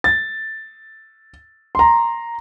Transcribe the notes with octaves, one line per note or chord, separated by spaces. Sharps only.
A6
A#5 C6